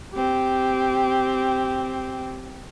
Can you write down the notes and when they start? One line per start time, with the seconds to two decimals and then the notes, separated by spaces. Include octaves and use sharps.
0.14 C4 G4